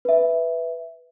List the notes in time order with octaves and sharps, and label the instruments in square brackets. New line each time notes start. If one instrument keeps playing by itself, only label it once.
[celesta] B4 E5